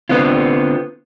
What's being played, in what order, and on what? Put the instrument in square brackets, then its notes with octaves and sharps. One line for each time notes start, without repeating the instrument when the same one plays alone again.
[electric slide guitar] D3 B3 C4 F4